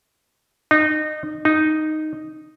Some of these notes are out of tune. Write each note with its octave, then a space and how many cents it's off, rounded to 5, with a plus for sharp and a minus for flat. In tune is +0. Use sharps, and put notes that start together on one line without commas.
D#4 -25
D#4 -5